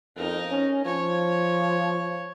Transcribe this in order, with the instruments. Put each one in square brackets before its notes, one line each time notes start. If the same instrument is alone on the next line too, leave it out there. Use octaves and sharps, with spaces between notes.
[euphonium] F2 [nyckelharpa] D#4 A#4
[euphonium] C#4
[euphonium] F3 [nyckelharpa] C#5